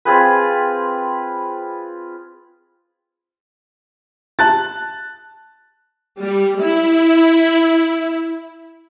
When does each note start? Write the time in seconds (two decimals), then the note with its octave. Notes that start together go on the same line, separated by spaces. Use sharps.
0.05 C4 F4 G#4 B4
4.39 A5 F#6 A6
6.20 G3
6.62 E4